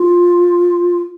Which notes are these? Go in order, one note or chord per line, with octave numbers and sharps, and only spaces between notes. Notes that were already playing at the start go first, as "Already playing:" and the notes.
Already playing: F4